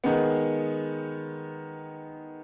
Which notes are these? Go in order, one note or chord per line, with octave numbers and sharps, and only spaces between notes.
D#3 G#3 B3